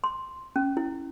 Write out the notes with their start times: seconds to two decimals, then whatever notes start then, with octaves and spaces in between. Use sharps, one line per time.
0.04 C6
0.56 C#4
0.77 E4